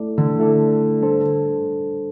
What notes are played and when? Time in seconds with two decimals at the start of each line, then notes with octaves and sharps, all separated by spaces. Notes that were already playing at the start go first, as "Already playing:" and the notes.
Already playing: A3 E4 A4 D5
0.18 D3
0.39 A3 E4 A4 D5
1.01 G3 D4 A4 C5